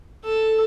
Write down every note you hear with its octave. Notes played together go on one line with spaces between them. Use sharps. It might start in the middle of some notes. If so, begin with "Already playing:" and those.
A4